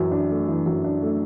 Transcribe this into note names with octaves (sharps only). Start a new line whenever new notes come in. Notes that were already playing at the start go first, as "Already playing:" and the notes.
Already playing: F#2 E3
D4
A3
E3
F#2
D4
A3